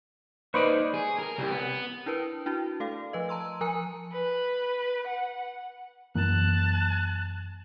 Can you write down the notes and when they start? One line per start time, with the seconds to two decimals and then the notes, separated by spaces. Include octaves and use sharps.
0.54 A#3 D#4 B4 C5 D5 C#6
0.94 G#4
1.19 A#4
1.38 C2
1.51 B3
2.06 D4 E4 A#4 B4
2.46 D4 E4 F#4
2.80 A3 A4 F5
3.13 F3 B4 D#5
3.29 A5 A#5 C6 E6
3.61 F3 A#4 G#5 A#5 C#7
4.12 B4
5.07 F#5
6.15 F#2 E3 A#3 A5 F#6